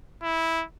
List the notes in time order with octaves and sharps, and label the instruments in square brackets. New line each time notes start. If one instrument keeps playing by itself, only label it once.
[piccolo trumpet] E4